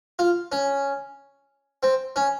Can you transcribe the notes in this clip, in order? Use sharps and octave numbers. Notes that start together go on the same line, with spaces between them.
F4
C#4
C4
C#4